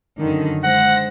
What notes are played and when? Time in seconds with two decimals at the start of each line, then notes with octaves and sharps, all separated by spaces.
0.18 F#2 D3 D#3
0.64 G#3 C5 F#5 A#6